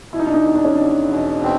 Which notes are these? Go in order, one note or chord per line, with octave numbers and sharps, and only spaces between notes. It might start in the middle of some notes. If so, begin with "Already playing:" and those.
B2 E4
D#4
D4
D#4
E2 D#4
D4
C#4
E2 D4
B2
C4